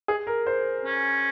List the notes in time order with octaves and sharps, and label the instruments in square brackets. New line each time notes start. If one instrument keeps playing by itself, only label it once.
[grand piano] G#4
A#4
C5
[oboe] C#4